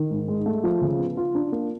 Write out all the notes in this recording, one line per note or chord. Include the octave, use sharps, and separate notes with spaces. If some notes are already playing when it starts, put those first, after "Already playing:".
Already playing: D#3
G#2
G#3
A3
F3
C#3
B3
F4
D4
A#3